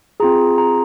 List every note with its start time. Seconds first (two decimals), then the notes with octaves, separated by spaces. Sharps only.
0.20 C4 F4 G#4 A#5
0.58 A#5